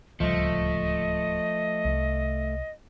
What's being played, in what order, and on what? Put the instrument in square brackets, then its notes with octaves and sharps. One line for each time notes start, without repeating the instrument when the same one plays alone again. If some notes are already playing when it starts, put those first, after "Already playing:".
[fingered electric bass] D1 C#2 G3 [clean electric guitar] F3 [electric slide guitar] A3 [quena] D#5
[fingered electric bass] C2